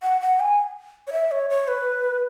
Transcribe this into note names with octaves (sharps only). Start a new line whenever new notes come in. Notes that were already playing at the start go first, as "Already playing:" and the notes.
F#5
F#5
G#5
C#5
E5
C#5
C#5
B4